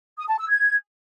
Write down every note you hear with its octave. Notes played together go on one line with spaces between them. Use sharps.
D#6
A5
E6
G#6